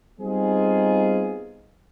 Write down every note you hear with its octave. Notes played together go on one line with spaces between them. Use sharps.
G3 B3 C4 D#4 F4 G#4